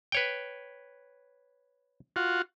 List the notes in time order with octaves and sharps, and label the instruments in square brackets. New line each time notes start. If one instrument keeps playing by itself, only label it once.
[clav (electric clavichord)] B4 C#5 G5
[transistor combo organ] F4 F#4